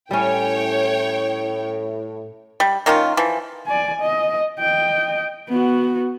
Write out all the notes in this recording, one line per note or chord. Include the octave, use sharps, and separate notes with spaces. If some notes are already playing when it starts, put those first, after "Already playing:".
A2 G3 C#4 C#5 G5
G3
D#3 A#3 C#4 F4
E3 F3
D5 G#5
D#5
D#5 G5
B3 F#4